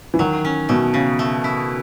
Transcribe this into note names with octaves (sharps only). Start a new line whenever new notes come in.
E3
D#3 F#3
C#4
B2 A3
C#3
A3
E4